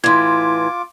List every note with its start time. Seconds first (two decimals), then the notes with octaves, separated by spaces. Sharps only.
0.04 A2 E3 F4 C6 D6 G#6